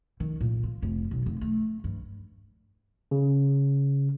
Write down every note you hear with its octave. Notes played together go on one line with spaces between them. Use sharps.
D#3
A#2
F4
F1
B1
F1
A3
G2
C#3